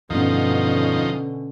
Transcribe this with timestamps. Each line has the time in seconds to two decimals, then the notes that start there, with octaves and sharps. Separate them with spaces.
0.10 E2 G2 B2 D3 F3 B3 C#4 D#4